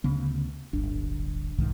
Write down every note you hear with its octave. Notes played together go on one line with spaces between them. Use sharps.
D2 C#3 B3
D1 G1 D4
B1 G#2 D#3